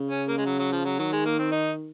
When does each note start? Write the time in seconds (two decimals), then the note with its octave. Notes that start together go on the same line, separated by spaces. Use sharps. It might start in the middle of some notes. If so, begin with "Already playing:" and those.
Already playing: C#3
0.11 C#4
0.28 A#3
0.38 G#3
0.46 F#3
0.59 F#3
0.72 F3
0.86 F#3
0.99 D#3 F#3
1.13 G#3
1.26 A#3
1.39 C4
1.52 D#4